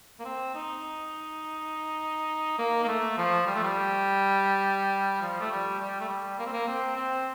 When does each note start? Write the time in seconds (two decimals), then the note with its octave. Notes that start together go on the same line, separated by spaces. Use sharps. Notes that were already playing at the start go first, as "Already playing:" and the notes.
0.20 A#3
0.25 C4
0.55 D#4
2.59 A#3
2.84 A#3
2.88 A3
3.18 F3
3.47 G3
3.55 A3
3.63 G3
5.22 F3
5.41 A3
5.51 G3
5.80 G3
6.00 A3
6.09 G3
6.39 A#3
6.46 C4
6.53 A#3
6.68 C4
6.96 C4